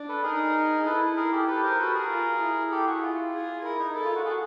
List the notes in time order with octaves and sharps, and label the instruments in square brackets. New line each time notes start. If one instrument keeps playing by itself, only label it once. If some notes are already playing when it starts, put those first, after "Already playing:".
Already playing: [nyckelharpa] D4
[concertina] A4 B4
[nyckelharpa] D#4 [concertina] G#4 A#4
[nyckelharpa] E4 [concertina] A4 B4
[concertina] G#4 A#4
G4 A4
[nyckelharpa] G4 [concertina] A4 B4
[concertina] A#4 C5
[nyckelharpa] F#4 [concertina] A4 B4
[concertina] G#4 A#4
[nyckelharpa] F4
E4
[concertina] G4 A4
F#4 G#4
F4
[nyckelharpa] G#4
[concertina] E4 [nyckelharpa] A#4
[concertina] D#4
[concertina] E4 [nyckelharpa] A4
[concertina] F4
F#4
F#4 G#4